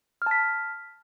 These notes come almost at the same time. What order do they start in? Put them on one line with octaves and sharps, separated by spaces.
F6 A5 B6